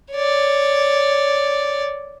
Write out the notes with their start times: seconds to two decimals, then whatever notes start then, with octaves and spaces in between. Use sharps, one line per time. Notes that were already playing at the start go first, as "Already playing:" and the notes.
0.12 C#5 D5